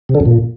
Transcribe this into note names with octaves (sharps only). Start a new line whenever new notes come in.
C3
D3
F#2
A#2